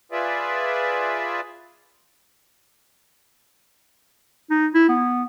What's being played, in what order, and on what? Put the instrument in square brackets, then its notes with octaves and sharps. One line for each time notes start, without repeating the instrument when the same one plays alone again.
[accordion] F4 G#4 B4 D5 E5
[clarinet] D#4
E4
B3